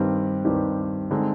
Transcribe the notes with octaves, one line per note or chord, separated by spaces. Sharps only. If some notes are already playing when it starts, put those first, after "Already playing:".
Already playing: G2 D#3 G3 C4 G4
G2 D#3 G3 C4 G4
D3 G#3 C4 D#4